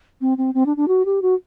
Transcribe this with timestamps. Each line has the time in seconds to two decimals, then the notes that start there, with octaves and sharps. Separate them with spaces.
0.21 C4
0.38 C4
0.54 C4
0.66 D4
0.77 D4
0.88 F#4
1.05 G4
1.22 F#4